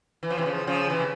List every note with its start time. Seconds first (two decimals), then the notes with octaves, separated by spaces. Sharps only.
0.23 E3
0.30 F3
0.37 C3 E3
0.46 C#3 F3
0.67 C#3 F3
0.90 C3 E3